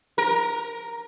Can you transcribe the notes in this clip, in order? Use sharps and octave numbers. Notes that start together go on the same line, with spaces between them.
A#4